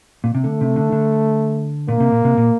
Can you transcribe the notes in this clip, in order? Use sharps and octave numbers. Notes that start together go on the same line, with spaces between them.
A#2
C3
D3 A3
C3
D3
D3
A#2 A#3
C3
A#2
C3
A#2